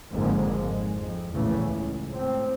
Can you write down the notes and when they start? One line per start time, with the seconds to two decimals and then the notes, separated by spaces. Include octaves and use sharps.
0.12 G#1 F2 G#2 D3 G#3 A#3
0.54 G#3
0.98 F2
1.34 A#1 E2 A2 C#3 E3 A3
1.64 C#2
2.10 A2 C4